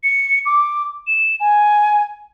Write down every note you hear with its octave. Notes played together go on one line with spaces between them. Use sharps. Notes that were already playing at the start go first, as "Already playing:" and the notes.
C#7
D6
E7
G#5